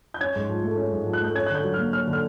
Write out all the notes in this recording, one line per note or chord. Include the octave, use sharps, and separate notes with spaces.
G6
C#4 G#6
G#2
F3
A3
C#4
G#2
F3
F#6
A3 G6
C#4 G#6
F#6
D3 G6
F#3
A#3 F6
C#4 F6
D3
F6